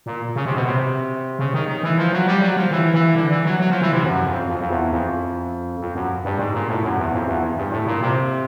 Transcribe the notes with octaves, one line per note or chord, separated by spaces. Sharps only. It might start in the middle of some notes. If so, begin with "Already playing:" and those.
A#2
C#3
C3
B2
C3
C#3
D#3
D#3
E3
F3
F#3
G3
F#3
F3
E3
E3
D3
E3
F#3
F#3
F3
E3
C3
F#2
F2
F2
F2
E2
F2
F2
F#2
G2
G#2
A#2
A2
F#2
E2
F2
E2
G2
A2
A#2
C3